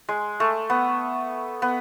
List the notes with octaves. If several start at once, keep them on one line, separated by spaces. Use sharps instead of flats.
G#3
A3
B3
B3